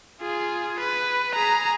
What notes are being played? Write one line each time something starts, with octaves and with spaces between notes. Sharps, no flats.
F4 G#4
B4
G#4 A#5